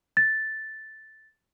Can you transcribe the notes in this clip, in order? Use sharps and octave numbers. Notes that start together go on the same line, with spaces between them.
A6